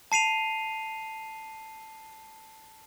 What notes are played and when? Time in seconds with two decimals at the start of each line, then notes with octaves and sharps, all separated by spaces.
0.12 A5 C7 D#7 F7